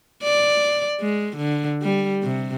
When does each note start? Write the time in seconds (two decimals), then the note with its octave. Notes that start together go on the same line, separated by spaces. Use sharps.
0.23 D5
1.00 G#3
1.37 D3
1.82 G3
2.23 C3